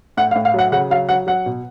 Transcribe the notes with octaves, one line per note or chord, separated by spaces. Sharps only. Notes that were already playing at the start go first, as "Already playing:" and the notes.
A2 F#5
F5
A2
F5
F#3 F#5
C#3 F#5
F#3 F5
F#3 F#5
F#3 F#5
B2